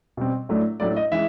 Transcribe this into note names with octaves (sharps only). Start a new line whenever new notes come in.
B2 G3 C4
A2 F#3 A3 D4
A2 F#3 A3 D4 D5
D#5
E3 G#3 E5